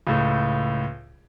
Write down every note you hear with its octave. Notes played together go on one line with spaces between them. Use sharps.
C#2 A2